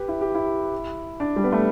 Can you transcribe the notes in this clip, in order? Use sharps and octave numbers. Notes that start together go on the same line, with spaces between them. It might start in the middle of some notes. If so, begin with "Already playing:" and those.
Already playing: G4 B4
E4
G4
E4
D4
G3
B3
A3